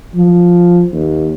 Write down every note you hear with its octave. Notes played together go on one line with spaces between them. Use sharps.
F3
D#2